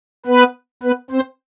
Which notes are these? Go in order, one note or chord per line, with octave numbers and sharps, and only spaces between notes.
B3 B4
B3 B4
C4 C5